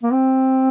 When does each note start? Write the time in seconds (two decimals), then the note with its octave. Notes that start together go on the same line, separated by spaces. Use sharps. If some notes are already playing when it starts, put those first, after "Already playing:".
0.03 A#3
0.12 C4